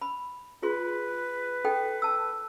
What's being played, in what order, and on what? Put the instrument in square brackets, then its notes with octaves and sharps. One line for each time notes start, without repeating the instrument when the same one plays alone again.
[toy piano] B5
[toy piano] F4 G#4 C6 [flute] B4
[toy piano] D#4 A4 G5
A5 E6